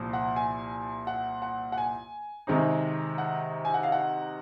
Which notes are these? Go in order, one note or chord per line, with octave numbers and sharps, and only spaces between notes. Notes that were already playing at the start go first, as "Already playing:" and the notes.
Already playing: C2 A#2 F3
F#5
G#5
F#5
F#5
F#5
G#5
C3 D#3 G#3 C4 D#4
F#5
G#5
F#5
F5
F#5